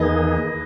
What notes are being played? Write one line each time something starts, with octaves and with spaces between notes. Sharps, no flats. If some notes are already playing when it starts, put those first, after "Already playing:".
Already playing: E2 D#3 A#3 D#4 G#4 B4 D#5